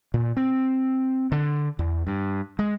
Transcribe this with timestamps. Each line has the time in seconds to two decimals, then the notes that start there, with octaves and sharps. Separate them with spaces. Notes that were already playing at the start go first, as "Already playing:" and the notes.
0.14 A#2
0.37 C4
1.32 D3
1.79 E2
2.07 G2
2.59 G#3